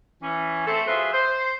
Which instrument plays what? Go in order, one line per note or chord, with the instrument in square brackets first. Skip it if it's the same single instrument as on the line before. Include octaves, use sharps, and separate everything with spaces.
[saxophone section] E3 C#4
A3 C4 A4
F#3 F4 G#4 B4 C5 E5
C5